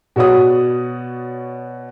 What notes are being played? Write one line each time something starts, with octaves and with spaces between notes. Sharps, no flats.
B2 F#4 C#5 D5 D#6